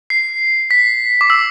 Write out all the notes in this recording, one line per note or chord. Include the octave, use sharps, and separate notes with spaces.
C7
B6
D6
E6